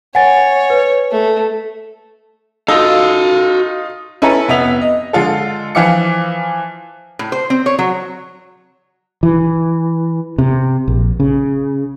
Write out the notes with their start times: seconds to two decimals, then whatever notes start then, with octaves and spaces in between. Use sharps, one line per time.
0.15 C#5 F#5 G#5 A6
0.70 B4
1.11 A3
2.68 D#4 F4 F#4 A4 F5
4.22 C#4 E4 A4 B4 A#5
4.48 F1 B3 E5 F7
4.81 D#5
5.13 D3 G#3 F4 A4
5.75 E3 F3 F5 D6 C#7
7.19 A2
7.32 C5
7.50 C4
7.66 C#5
7.79 F#3
9.23 E3
10.38 C3
10.88 A#1
11.20 C#3